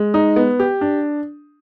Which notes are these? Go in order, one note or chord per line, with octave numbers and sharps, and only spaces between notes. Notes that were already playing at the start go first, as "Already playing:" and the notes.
Already playing: G#3
D#4
B3
G4
D4